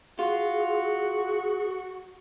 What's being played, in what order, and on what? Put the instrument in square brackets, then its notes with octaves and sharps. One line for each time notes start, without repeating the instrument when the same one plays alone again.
[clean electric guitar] F4 [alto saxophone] F#4 [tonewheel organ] G#4